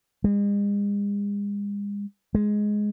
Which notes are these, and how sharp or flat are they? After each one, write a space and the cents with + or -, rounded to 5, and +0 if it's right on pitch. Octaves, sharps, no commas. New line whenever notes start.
G#3 -40
G#3 +5